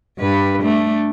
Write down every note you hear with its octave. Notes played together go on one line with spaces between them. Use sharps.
G2 B4
A3 D4